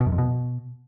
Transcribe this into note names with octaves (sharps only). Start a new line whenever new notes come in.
B2
F#2
F2
B2